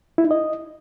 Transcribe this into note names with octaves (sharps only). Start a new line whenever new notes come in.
E4
D#4
D#5